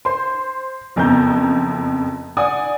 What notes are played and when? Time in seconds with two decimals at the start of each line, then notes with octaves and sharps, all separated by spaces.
0.05 C5 C6
0.96 F#1 F2 B3 A#5 G6
2.37 D5 F#5 G#5 D#6